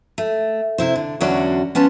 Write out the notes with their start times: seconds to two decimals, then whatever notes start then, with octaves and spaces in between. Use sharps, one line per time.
0.18 A3
0.78 C3 E4 C5
0.96 D3
1.21 E2 D3 F#3 C#4 F#4 D5
1.75 B3 C#4 F4 A5